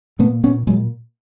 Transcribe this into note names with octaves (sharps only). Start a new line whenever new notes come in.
A#2 A3 B3
A#2 B3 C#4
A#2 F#3 G#3